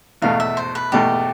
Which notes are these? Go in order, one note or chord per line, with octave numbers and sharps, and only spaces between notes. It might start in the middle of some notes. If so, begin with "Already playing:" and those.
E2 B2 A3 F5
E5
C5
B4
E2 B2 A3 G4